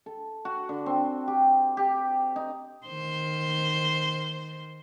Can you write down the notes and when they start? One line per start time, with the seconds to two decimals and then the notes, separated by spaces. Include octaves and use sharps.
0.06 A4
0.45 F#4
0.69 D3
0.86 C4
1.28 G4
1.77 G4
2.36 D#4
2.87 D#3 C5